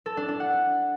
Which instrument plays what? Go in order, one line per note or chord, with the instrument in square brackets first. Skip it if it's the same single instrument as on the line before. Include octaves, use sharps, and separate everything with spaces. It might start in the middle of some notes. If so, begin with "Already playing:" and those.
[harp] A4
D4
D4
F#5